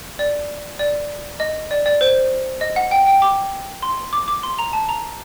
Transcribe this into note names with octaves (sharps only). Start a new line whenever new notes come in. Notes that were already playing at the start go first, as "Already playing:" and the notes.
D5
D5
D#5
D5
D5
C5
D#5
F#5
G5
G5
D6
C6
D6
D6
C6
A#5
A5
A#5